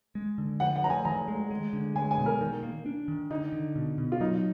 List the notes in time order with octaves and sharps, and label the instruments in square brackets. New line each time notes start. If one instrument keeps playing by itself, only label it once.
[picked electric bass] G#3
D3
[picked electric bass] F3 [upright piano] F#5
[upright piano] F#5
[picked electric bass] F3 [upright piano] A#5
[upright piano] G#5
[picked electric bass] D#3 [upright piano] A#5
[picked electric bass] G#3
G#3
D3
[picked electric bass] G#3 [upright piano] G#5
[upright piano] G#5
[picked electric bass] B2
[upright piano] A#4
[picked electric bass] D#3
A#3
D4
D#3
[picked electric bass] D3 [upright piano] D#4
[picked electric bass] D3
B2
B2
[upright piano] F4
[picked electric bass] F#3 [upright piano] D#4